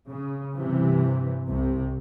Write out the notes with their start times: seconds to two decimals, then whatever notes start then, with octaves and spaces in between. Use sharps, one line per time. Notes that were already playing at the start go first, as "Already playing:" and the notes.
0.10 C#3
0.53 G2 C3 E3
1.49 C2 C3